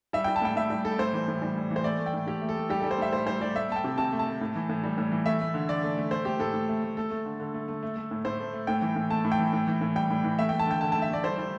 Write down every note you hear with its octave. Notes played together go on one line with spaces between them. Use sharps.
G3 E5
G3 G5
A5
A2 G5
A2 E5
G3
G3 A4
A2 C5
E3
A2
G3
A2
E3
C5
A3 D5
A3
G5
A2
A2 G4
A3
A4
A3
G3 G4
G3 A4
C5
A2 E5
A2 C5
G3 C5
G3 D5
A3 E5
A3 A5
G5
C3
C3 A5
A3
A5
A3
A2
E3
A2
G3
A2
E3
A3 E5
A3
D3
D3 D5
A3
A3
A3 C5
A3 G4
A2 A4
A2
A3
A3
A3 A4
A3
D3
D3
A3
A3
A3
A3
A2
A2 C5
A3
A3
A2 G5
E3
A2
A3 A5
A2
G5
E3
A2
E3
A2
G3 G5
A2
E3
A3 E5
A3 G5
A5
D3 G5
D3 A5
A3 A5
E5
A3 D5
G3 C5
G3